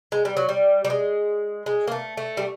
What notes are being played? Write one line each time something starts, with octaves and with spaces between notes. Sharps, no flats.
G#3
G3
F#3
G3
G3
G#3
G#3
A#3
A3
A3
G3